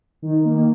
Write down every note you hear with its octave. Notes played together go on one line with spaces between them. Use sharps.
D#3
A#3